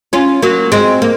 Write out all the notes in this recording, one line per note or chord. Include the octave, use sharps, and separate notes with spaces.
C#4 F4
F#3 A#3
G#3 C4
A#3